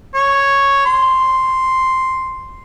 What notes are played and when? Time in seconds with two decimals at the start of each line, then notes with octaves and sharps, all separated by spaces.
0.15 C#5
0.86 C6